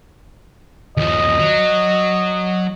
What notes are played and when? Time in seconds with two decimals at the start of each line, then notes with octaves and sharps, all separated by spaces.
0.97 D#2 F3 D#5
1.39 F#3